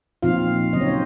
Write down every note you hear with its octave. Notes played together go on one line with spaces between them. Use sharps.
A#2 F3 C4 D#4 F4 F5
C#3 F#3 C4 D#4 D#5
C#5
C5